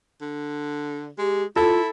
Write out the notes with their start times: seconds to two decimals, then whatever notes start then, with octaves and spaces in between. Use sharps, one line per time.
0.21 D3
1.18 G#3 G4
1.56 E4 F4 A4